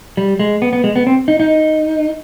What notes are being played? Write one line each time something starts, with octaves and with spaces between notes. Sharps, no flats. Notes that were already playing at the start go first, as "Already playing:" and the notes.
G3
G#3
B3
B3
G#3
B3
C4
D#4
D#4